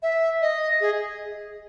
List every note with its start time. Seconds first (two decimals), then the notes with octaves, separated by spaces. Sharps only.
0.03 E5
0.42 D#5
0.81 G#4